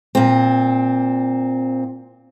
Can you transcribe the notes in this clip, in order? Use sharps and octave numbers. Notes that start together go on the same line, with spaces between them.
A#2 C4